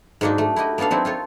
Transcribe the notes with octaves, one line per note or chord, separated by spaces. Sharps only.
G#2 F#3 A#3 D4 D#4
A3
E4 F#4 G4 D#5
A#3 B3 D4 A4 F5
F#3 C4 D#4 E4
F4 A4 C#5